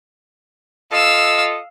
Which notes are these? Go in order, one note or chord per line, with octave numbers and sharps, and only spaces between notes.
F4 A4 D#5 F5 E6